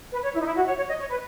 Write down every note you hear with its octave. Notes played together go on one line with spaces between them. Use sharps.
B4
C#5
E4
D#4
E4
F#4
C#5
C#5
D#5
C#5
B4